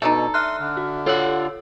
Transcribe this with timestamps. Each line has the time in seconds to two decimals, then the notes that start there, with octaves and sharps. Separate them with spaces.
0.02 B2 A3 D4 D#4 A4
0.34 E5 C6 F6 F#6
0.59 D3
0.77 F#4
1.06 F4 A4 C#5 F#5 E6